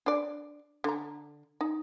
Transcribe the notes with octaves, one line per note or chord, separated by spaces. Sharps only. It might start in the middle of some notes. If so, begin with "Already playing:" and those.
D4 D5
D3 A#5
D#4